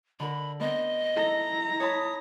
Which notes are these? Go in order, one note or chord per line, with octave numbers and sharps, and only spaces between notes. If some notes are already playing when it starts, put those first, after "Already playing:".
D3 A#4 B5
B3 C4 A#4 D#5
D#4 E4 A4 A#5
C#5 A5 B5 D#6